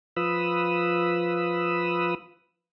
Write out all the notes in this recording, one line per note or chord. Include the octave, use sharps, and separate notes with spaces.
F3 F4 B4 B5 D#6 E6